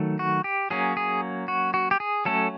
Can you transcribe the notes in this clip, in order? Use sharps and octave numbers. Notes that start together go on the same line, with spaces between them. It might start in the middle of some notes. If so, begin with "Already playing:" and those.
Already playing: D#3 F#3 A3
F#4
G4
F#3 A#3 C#4 G#4
G#4
F#4
F#4
G4
G#4
F#3 A3 C#4 A4